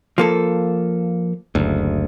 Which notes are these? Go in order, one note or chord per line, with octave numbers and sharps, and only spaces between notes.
F3 A#3 A4
F#1 D2